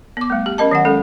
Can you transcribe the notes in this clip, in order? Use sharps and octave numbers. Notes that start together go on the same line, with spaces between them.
B3 D6
G3 A3
G4
C#4 A#4 D#5 A5
D#3 F#3 F#5
G#3 C#4 A4